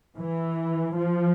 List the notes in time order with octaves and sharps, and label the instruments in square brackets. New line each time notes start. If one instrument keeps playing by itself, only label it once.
[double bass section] E3
F3